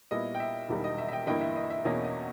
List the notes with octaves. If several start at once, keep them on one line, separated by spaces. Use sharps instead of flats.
A#2 G3 B3 E4 D#5
G5
E5
E1 E2 D#3 G3
D#5
E5
E5
D#5 G5
G1 G2 E3 A#3 E4 D#5 G5
E5
D#5
E5
E2 B2 A#3 C#4 D#5
D#5